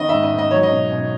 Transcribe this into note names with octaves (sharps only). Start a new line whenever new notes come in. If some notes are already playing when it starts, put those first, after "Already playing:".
Already playing: D#3 B3 D#5
G#2 E5
D#5
G#2 D#5
F#3 C#5
D#5
B2
B2